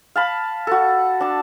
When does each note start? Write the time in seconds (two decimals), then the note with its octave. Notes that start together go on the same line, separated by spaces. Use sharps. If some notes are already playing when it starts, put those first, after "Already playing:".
0.16 F5 A5 B5
0.67 F#4 A4
1.21 D4 A5